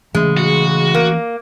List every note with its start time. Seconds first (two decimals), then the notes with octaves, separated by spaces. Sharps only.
0.15 C#3 E3 G#3 A3 C#4
0.37 F#4
0.95 A#3